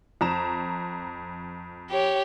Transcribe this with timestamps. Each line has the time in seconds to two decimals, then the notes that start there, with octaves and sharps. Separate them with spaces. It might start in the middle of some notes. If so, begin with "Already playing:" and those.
0.21 F2 A#5 E7
1.91 G4 C#5